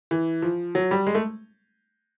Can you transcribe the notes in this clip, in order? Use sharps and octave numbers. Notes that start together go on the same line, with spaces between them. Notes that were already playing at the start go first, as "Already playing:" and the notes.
E3
F3
F#3
G3
G#3
A3